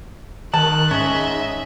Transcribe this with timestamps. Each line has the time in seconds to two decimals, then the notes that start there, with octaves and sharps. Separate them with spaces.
0.54 D#3 A5 F#6
0.91 G#2 C#4 D#5 E5